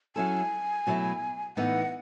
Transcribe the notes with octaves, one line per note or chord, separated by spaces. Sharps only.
F#3 C#4 E4 A4 G#5
B2 F#3 A3 E4
A2 E3 B3 D#4 F#5